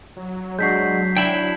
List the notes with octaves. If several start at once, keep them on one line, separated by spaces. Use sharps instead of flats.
F#3
G#3 D4 F#4 G6 B6 C7
D4 E4 G5